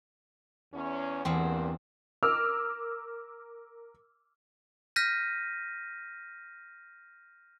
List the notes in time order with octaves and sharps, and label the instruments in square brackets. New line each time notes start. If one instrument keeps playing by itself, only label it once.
[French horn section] E2 C#4
[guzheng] E2 C4 [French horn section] G2 A#3
[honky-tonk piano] A#4 D6 E6 F6
[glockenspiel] F6 G6 A#6 B6 D#7